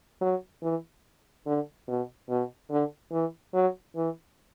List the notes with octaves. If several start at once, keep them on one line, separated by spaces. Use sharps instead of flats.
F#3
E3
D3
B2
B2
D3
E3
F#3
E3